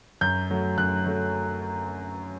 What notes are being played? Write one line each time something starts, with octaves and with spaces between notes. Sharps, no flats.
F#2 G6
F#3 A3
F#2 F#6
F#3 A3